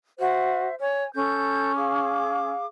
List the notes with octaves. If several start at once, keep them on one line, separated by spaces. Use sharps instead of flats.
F#4 C5 E5
C#5 G#5
C#4 A4 G6
G#4 F5 D6